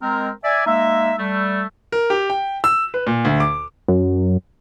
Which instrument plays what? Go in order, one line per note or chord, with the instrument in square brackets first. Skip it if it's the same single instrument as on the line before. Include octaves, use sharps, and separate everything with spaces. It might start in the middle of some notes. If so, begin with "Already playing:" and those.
[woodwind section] G#3 C4 A#4
D5 E5 G#5
G#3 A#3 D#4 E5
G3 A3
[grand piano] A#4
G4
G5
E6
B4
A#2
D2
D6
[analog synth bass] F#2